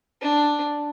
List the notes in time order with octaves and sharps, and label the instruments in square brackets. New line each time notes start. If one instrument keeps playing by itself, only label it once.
[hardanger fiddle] D4